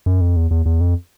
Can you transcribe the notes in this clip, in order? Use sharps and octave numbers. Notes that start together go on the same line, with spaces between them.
F#2
F2
E2
E2
E2
F2